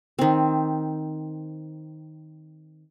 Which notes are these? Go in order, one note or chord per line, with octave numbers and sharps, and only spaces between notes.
D#3 C4